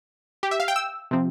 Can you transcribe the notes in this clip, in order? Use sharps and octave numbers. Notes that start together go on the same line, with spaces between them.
G4
E5
F5
G5
E6
C3 F3 C4